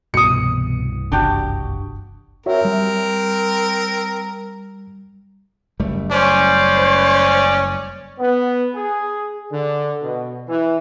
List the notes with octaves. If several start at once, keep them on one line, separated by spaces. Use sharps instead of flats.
C2 G2 B2 E3 D#6 C#7
F#1 D4 F#4 G4
C4 F#4 A#4 C#5 E5
G3
F#1 G3 A3
C#4 C5 D5
B3
G#4
D3
B2
E3